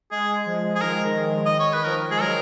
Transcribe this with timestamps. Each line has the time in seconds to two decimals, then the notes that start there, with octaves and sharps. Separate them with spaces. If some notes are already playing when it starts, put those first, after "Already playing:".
0.11 G#3 G#4
0.46 F3
0.75 G#4
0.81 D#3 A#4
1.04 D#3
1.46 D#3 D#5
1.59 C#5
1.73 D#3 B4
1.85 F3 A#4
2.10 G#3 G#4
2.20 F#3 A#4